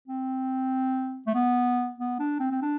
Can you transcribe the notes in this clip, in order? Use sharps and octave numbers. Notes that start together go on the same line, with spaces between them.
C4
A3
B3
B3
D4
C4
C4
D4